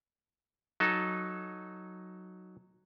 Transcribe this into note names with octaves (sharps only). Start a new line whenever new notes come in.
F#3 D#4 A4